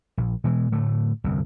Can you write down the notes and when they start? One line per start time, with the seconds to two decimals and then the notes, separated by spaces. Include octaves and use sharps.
0.17 A#1
0.44 B2 E3 G#3
0.72 A2 D3 A3
1.24 G1 C2 F2